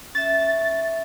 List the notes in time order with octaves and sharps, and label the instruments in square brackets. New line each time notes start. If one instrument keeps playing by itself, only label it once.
[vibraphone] C#4 E5 [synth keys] A6